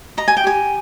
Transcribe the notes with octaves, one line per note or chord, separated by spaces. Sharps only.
D#5 A#5
G#5
G5
G4 G#5